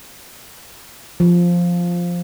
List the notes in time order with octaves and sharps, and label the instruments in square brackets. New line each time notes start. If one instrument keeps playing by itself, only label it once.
[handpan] F3